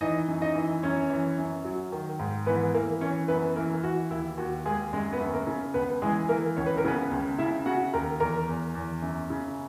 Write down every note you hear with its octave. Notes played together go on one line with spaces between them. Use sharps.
E3 D#4 D#5
F#2
D#4 D#5
E3
F#2 C#4 C#5
E3
F#2
F#3
D#3
G#2
E3 B3 B4
E3 A#3 A#4
E3 C#4 C#5
F#2 B3 B4
E3 A#3 A#4
E3 F#4
D#2 E4
D#2 F#4
D#2 G#3 G#4
F#2 G#3 G#4
B3 B4
F#2
A#3 A#4
C#3
C#2 B3 B4
E3 G#3 G#4
E3 A#3 A#4
C#2 C#5
B4
A#4
C#3 B3 B4
C#2
C#3 E4 E5
C#3 F#4 F#5
D#2 A#4 A#5
E2 A#4 A#5
E2
E2
F#2
C#3